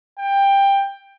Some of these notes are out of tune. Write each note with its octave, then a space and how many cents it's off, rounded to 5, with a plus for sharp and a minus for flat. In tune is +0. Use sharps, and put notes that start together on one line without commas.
G5 +15